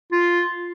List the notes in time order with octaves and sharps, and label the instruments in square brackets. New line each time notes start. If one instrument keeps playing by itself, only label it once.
[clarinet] F4